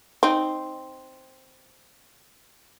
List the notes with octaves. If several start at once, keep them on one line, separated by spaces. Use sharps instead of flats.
C4 D#4